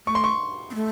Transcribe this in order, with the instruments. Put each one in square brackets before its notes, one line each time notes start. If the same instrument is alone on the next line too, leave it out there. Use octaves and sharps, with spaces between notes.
[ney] A3 [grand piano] C#6
[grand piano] C6
C#6
[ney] C4
A3